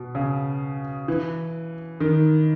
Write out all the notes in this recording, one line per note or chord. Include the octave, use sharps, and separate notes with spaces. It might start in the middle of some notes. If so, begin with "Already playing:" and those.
Already playing: B2
C#3
E3
D#3